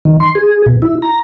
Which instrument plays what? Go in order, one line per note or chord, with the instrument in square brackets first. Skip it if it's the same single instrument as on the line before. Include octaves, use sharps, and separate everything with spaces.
[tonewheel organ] D#3
C6
G#4
B2
E4
A#5